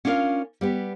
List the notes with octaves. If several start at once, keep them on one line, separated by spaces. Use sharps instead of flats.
C#4 D4 F4 A#4 F5
G3 B3 G4